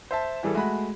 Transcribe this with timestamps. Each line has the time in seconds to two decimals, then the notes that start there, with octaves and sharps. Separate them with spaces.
0.11 C5 E5 A5
0.43 E3 G3 G#4 A4
0.55 G#3 A3 F#4 B5